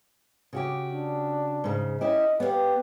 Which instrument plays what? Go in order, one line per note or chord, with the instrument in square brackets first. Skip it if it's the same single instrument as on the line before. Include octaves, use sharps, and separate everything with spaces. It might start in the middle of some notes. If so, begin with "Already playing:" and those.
[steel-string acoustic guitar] C#3 F#4 G4
[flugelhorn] D4
[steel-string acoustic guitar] G#2 C#3
[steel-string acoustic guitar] C#4 E4 G4 [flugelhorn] D#5
[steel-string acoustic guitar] B3 C#5 F5 [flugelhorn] G4